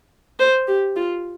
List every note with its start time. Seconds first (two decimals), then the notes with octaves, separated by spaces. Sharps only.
0.39 C5
0.68 G4
0.96 F4